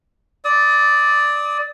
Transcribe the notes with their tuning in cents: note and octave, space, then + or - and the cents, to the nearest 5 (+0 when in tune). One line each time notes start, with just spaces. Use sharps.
D5 +0 D#6 +35